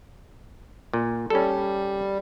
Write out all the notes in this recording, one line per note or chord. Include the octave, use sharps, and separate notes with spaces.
A#2
G3 C#4 A4